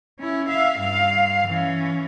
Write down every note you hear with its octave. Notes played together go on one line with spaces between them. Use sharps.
C#4 E4
E5 F5
G2 F5
E3 C#4